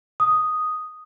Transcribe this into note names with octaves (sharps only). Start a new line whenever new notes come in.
D#6